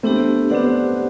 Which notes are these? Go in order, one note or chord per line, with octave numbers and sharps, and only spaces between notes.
A3 B3 C4 D4 G4
B3 C4 D4 G4 C5 F#5